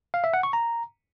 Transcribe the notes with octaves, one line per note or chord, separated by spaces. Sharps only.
F5
E5
F#5
C#6
A#5